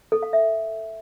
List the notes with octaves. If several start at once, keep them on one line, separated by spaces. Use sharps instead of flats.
A4
F5
E5